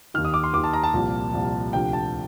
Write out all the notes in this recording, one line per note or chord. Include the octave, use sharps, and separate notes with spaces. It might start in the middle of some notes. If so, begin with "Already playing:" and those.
D#2 D#3 F6
D#6
D6
C6
D#2 D#3 D6
A5
A#5
A5
C2 A#2 F3
C2 A#2 F3
D2 C3 F3 G5
A5